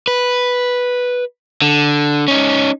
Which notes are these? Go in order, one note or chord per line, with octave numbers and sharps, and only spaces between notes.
B4
D3
C#4 D#4